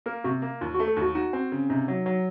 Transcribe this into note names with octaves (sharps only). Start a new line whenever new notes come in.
A#3 A#4
C3 F#4
A#3
D#2 F4
F#4
A3
A4
D#2
F#4
D#4 F#4
C4
C#3
C3 D#4
F#3
F#3